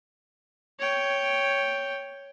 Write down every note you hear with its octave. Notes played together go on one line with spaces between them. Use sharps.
C#5 G5